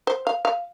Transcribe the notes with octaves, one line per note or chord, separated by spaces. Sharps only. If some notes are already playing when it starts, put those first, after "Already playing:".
C5
F5
F5